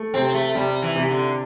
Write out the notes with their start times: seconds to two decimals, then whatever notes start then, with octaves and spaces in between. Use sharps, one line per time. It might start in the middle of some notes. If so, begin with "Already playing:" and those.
Already playing: A3
0.14 C3 C4
0.34 A3
0.55 C3 G3
0.82 E3
0.96 C3
1.10 D3